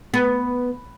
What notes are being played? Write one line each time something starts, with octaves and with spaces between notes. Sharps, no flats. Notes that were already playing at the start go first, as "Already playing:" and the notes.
B3